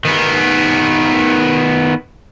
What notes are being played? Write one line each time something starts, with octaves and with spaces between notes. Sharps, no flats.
D#3 B3